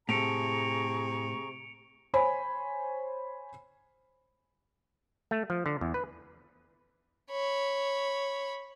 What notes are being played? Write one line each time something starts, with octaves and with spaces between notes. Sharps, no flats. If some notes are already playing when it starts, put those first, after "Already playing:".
A2 C3 G#4 A#5 C#6 C#7 D7 F7
C5 C#5 G#5 B5
A3
F3
D3
E2
B4
C#5 B5